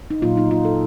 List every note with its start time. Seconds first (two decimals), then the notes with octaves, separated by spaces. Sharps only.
0.10 D#4
0.22 A#2 F#3 A#3 F4
0.37 D#4
0.51 F4
0.65 A4